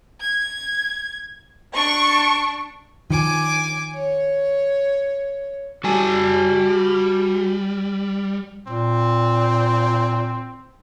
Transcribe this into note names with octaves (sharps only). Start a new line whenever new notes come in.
G#6
D4 C#6
D#3 F3 G#5 D6
C#5
G3 F#4 G#5 A5
A#2 C4